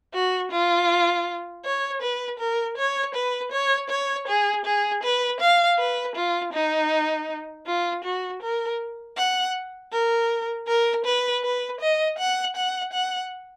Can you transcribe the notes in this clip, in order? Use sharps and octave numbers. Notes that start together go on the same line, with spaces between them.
F#4
F4
C#5
B4
A#4
C#5
B4
C#5
C#5
G#4
G#4
B4
F5
B4
F4
D#4
F4
F#4
A#4
F#5
A#4
A#4
B4
B4
D#5
F#5
F#5
F#5